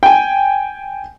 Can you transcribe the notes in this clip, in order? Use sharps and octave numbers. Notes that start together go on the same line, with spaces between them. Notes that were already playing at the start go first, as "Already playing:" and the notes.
G5 G#5